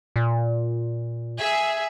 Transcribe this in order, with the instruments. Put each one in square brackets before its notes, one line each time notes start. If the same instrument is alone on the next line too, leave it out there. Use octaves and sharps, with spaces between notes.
[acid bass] A#2
[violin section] G#4 E5